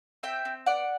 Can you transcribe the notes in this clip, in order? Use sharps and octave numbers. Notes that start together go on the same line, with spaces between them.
C4 E5 G5
C4
B3 D5 F#5